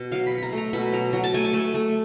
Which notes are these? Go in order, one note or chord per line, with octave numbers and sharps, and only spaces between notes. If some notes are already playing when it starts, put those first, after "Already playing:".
Already playing: B2
F#3 F5
B5
F#3
A#5 B5
A3
A#5
B2 B5
F#3 A#5
F#3 A#5
A5
A3 G#5
A5
A3
A3